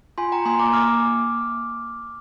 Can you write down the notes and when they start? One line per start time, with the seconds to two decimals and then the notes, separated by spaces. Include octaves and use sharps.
0.18 F4 G#5 C6
0.32 G5 A#5
0.45 A#3 G#5 C6
0.59 A#5 D6
0.73 A#3 D6 F6